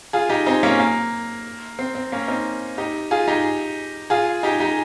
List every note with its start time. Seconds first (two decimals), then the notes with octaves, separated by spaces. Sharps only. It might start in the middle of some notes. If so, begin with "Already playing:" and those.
0.13 F4 G#4
0.29 D#4 G4
0.46 C4 D#4
0.63 A#3 C#4
0.79 A#3
1.79 C4
1.95 C4
2.12 A#3 C#4
2.28 C4 D#4
2.78 D#4 G4
3.11 F4 G#4
3.28 D#4 G4
4.10 F4 G#4
4.43 D#4 G4
4.60 D#4 G4